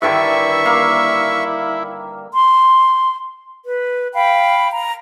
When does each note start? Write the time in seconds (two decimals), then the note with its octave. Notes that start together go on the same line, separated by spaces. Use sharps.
0.02 G2 D3 D#3 E4 E5 C#6
0.65 A#3 A#4 F5
2.33 C6
3.66 B4
4.14 F5 G5 B5
4.71 A#5